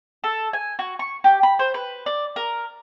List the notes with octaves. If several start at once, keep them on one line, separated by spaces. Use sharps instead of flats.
A4
G#5
F#4
C#6
G4
B5
C5
B4
D5
A#4